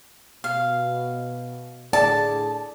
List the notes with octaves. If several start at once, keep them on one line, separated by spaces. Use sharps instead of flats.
B2 F5
A2 D3 G#4 D5 A5